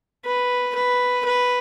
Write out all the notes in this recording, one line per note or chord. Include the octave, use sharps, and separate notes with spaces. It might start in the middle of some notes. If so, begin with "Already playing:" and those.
B4
B4
B4